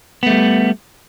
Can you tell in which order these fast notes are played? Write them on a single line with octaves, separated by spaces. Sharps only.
B3 A3 G3